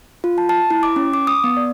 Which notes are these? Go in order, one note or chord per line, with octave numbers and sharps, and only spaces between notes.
F4
A5
A5
E4
D6
C#4
D6
D#6
B3
D5